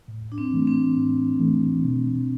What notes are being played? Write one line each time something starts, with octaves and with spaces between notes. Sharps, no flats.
A2
D4
C4
E3 A3
C4
A2
E3 A3
B2